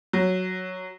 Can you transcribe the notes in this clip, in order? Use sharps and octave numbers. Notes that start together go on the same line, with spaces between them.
F#3